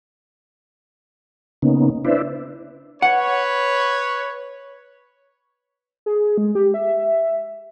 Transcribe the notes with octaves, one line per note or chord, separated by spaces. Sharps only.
C#3 A#3 B3 C#4 D#4
D4 E4 B4 C5 D5 E5
B4 C#5 F#5
G#4
G#3
G4
E5